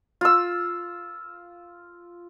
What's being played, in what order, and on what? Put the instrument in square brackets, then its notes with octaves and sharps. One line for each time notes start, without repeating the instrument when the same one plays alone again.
[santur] F4 E6